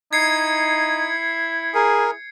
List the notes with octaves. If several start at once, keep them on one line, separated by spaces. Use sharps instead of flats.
D#4 E4 G#6 C7 C#7
G#4 A#4